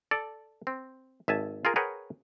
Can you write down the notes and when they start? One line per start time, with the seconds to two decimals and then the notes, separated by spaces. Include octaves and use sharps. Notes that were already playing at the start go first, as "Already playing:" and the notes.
0.11 A4 D5
0.67 C4
1.28 G#1 E5 G#5 A5
1.65 F4 G#4 A#4
1.76 G#4 A#4 B4 C#5 F#5 G5